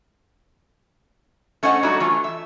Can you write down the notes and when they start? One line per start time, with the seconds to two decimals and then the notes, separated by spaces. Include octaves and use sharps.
1.63 A3 C#4 C5 D#5 E5 F#5
1.83 F#3 G3 A3 D4 D#4 F#4
2.00 E3 A3 F4
2.24 E5